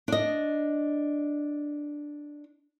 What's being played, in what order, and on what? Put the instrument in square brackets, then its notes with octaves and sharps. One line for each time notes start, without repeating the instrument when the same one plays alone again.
[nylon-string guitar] D4 D#5